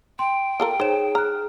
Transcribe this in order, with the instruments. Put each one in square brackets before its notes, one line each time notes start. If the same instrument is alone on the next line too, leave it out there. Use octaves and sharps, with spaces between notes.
[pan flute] G5 [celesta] C6
[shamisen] F4 A4 A#4
[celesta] D#4 C#5 E7 [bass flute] G#4 [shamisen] C5
[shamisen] A#5 [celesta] F6 F#6